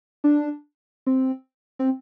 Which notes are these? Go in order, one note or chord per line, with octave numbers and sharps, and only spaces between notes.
D4
C4
C4